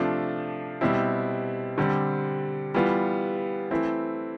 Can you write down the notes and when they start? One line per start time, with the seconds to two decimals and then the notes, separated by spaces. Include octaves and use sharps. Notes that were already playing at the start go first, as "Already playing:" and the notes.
Already playing: C3 F3 A3 D4 F4
0.81 B2 G3 C4 E4
1.78 D3 G3 C4
2.74 E3 G3 B3 F4
3.71 E3 A3 C4 E4